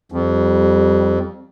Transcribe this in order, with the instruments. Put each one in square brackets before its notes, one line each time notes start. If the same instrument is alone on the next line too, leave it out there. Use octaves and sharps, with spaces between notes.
[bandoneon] F2 [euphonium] G3